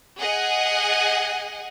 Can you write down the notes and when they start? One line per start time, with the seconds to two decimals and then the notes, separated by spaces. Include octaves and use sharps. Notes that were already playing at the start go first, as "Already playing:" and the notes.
0.19 G#4 D#5 F#5 G#5